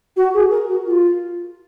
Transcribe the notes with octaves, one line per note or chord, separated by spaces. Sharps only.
F#4
G#4
A#4
F#4
F4